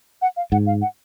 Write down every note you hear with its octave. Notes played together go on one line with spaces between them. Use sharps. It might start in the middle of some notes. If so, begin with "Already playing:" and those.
F#5
F5
G#2 F#5
F5
F#5